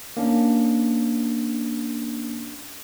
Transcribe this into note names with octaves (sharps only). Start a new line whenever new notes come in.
A#3 C#4 D4